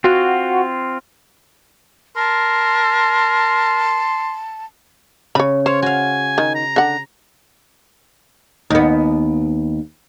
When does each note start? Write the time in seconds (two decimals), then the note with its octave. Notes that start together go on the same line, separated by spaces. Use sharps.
0.04 C4 F4 F#4
2.16 A#4 A5 C6
5.35 C#3 C#5 B5
5.66 C5 C#5 F5
5.82 F#4 F5 G#5
6.38 D#3
6.55 A#5
6.76 D3 F#5
8.70 D#2 B3